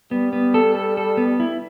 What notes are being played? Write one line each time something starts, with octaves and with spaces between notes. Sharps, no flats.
G3 B3
B3
A4
A4
A4
B3
E4